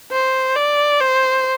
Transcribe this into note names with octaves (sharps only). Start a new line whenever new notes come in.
C5
D5
C5